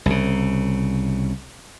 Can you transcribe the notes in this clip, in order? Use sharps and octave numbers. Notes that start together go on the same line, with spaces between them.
C2 C#3